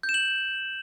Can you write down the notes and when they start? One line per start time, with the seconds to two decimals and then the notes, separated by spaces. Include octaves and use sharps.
0.03 G6
0.09 E7
0.14 F#7